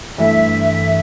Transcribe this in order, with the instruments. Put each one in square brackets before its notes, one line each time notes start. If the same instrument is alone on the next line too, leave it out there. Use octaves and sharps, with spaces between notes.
[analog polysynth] G2 E3 A3 [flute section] E5